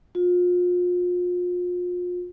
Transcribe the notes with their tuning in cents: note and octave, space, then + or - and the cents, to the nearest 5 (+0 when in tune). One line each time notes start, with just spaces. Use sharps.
F4 +35